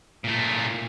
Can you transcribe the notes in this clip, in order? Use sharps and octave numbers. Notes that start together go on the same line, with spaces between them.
A#2 A3